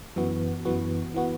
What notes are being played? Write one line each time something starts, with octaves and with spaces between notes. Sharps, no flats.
F#2 E3 B3 F#4
F#2 E3 B3 F#4
E3 B3 F#4